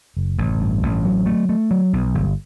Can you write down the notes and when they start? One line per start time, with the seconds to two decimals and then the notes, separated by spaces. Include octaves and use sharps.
0.17 F#1
0.38 A1
0.60 G2
0.83 A1
1.05 F#3
1.26 A3
1.49 A3
1.71 F#3
1.93 B1
2.15 G1